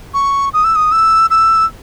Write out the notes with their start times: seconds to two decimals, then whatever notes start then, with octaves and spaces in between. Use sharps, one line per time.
0.14 C#6
0.53 D#6
0.64 E6
0.76 D#6
0.92 E6
1.30 E6